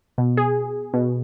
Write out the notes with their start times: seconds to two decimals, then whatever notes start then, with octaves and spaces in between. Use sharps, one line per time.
0.18 B2
0.37 G#4
0.94 B2